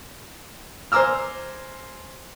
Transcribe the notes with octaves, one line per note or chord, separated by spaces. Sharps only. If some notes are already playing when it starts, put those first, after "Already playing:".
C5 G#5 A#5 D6 E6 F6